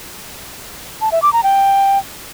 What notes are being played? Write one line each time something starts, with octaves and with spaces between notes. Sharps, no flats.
A5
E5
D6
A#5
G5